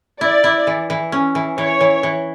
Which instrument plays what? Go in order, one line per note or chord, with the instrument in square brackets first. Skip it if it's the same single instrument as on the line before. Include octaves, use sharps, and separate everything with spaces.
[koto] E4 [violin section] D5
[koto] E4
E3
E3
C#4
E3
[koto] E3 [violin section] C#5
[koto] E3
E3